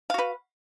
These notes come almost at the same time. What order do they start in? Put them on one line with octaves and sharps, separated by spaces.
F5 F#4 B4